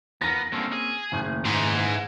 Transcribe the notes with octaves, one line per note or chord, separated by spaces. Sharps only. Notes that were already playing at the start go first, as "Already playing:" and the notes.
E2 B3 F4 A#4 A#6
G2 D3 A#3 C4 C#4
G#4
F#1 D#2 A2 D#3
G#2 E3